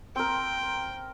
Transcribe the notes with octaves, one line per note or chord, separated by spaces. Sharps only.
C4 A#4 G5